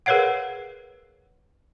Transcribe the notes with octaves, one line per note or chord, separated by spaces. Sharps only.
G#4 A#4 B4 C#5 F5 F#5